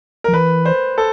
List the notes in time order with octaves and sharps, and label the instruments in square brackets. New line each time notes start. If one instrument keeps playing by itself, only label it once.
[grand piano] A#4
[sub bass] F3
[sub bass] E3 [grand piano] B4
[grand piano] C5
A4